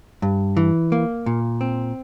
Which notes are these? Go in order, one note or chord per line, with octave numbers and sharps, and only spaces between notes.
G2
E3
A#3
A#2
C4